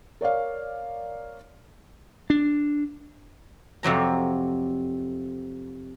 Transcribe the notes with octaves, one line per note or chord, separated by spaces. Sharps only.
A#4 C#5 D5 F5
D4
F2 C3 F#3 A#5